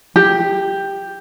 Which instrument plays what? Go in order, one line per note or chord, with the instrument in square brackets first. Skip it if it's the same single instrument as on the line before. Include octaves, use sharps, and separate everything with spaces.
[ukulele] G4